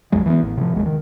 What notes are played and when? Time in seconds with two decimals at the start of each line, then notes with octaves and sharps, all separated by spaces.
0.12 B1 F2 F#3 G#3
0.26 E3 A#3 B3
0.42 A1
0.57 C3 F3
0.73 D1 G1 D#2 G#3
0.86 D#3